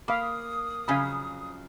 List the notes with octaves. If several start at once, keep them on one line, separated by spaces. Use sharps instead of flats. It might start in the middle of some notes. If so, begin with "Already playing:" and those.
A#3 F5 B5 D6 D#6
F2 C#3 F#3 F5 G#5 B5